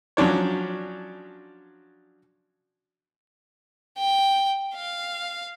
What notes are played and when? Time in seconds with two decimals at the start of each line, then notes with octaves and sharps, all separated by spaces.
0.17 F3 F#3 C#4 D4 C#5
3.98 G5
4.75 F5